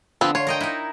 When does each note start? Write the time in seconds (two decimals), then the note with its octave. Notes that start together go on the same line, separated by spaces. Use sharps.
0.21 D3 F3 B3 C4
0.35 F4 C#5
0.47 A#4 D#5 G5
0.61 D#4 E4